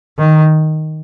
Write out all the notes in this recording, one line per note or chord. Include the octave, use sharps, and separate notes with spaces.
D#3